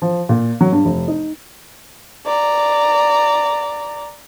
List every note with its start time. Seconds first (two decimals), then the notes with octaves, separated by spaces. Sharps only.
0.02 F3
0.29 A#2
0.61 F#3
0.72 G2
0.85 F1
1.08 D#4
2.26 D5 A#5